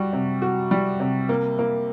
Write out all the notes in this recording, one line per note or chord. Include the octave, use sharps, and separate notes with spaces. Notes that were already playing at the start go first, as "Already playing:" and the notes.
Already playing: G3 F#4
C3
F#4
G3
C3
A#3
A#3